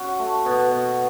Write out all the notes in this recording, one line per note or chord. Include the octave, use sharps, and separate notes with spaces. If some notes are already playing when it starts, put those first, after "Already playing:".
Already playing: C#4 F#4
A3
B2
B2